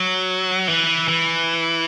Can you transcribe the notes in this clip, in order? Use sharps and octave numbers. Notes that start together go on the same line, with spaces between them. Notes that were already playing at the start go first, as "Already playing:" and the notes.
Already playing: F#3
E3
E3